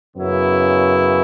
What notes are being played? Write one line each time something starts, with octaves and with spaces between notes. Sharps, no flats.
F#2 C#3 F#3 B3 E4